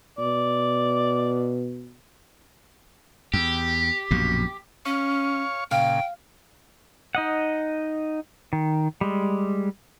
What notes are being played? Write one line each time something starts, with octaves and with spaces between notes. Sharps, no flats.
B2 D5
E2 G4
A#1 F#2 B2
C#4 C#5 F5 C#6
A#2 C#3 F5 G5
D#4 D#5 F#5
D#3
G3 G#3